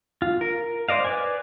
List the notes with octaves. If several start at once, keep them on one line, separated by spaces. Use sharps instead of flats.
F4
A#4
C5 D5 D#5 F5
B4 D5 G#5